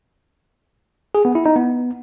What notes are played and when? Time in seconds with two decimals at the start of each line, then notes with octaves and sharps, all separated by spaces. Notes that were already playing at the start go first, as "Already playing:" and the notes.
1.15 G#4
1.25 B3
1.35 E4
1.46 D#4
1.56 B3